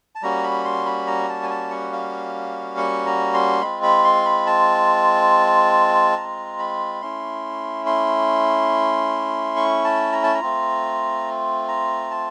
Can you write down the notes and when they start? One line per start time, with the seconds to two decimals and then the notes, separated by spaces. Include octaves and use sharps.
0.15 A5
0.22 G3 A#3 C#4 F#4 A#5
0.44 B5
0.65 C6
0.86 B5
1.07 A#5
1.28 A5
1.43 G#5
1.50 A5
1.71 F#5
1.93 F5
2.77 F#5
3.06 A#5
3.34 C6
3.61 G#3 C4 F4 B5
3.83 B5
4.04 C6
4.26 B5
4.47 A5
6.17 A#5
6.59 B5
7.01 A3 C#4 E4 C6
7.86 C6
9.56 C#6
9.84 A5
10.12 A#5
10.23 A5
10.34 A#5
10.41 A3 C4 F4
11.68 A#5
12.11 A5